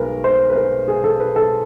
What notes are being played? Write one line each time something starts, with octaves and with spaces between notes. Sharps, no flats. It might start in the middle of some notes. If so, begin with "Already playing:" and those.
Already playing: B1 G#3 A#4 B4
C5
B4
A#4
G#4
A4
B4
A4